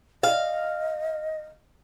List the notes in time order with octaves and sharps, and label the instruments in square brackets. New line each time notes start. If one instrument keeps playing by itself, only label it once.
[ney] D#5 [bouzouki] F5